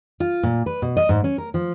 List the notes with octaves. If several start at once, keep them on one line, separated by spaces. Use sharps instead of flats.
F4
A#2
B4
B2
D#5
G#2
C#4
A#4
F3